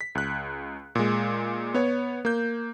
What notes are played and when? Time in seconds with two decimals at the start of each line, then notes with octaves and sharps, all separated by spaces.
0.01 B6
0.15 C#2 F#6
0.95 A#2 G#3
1.74 B3 C#5
2.25 A#3 G6